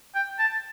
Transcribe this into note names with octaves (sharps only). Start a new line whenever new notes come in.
G5
A5